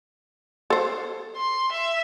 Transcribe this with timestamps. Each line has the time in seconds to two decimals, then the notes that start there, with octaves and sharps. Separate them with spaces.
0.70 A4 C5
1.37 C6
1.72 E5